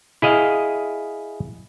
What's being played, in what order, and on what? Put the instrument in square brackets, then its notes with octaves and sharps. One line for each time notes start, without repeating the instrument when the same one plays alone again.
[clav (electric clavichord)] E4 G#4 D#5 F5